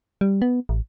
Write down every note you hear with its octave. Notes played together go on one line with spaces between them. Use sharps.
G3
B3
A1